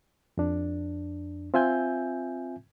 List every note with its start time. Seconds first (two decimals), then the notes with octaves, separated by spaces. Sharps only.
0.37 F2 D4
1.54 C4 F4 E5 G#5 G6